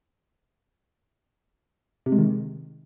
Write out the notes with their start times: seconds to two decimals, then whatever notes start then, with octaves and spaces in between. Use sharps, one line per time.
2.06 C3
2.12 G#3
2.18 D#3